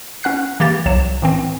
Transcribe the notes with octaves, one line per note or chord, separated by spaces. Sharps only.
C#4 F#5 F#6 C7
E3 A#3 G4 A6
C2 F#3 E7
A2 E3 C4